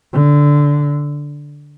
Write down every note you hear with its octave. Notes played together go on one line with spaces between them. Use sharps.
D3